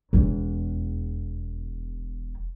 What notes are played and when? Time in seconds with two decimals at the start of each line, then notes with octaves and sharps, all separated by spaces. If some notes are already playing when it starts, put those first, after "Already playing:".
0.13 E1 E2